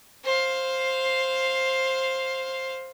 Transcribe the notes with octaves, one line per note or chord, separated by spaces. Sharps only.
C5 F5